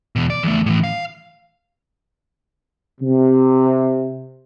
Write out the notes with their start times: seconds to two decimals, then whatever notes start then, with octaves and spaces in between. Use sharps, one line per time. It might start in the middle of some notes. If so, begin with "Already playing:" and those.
0.16 E2 B2
0.30 D5
0.43 E2 A3
0.66 A2 E3
0.84 F5
3.01 C3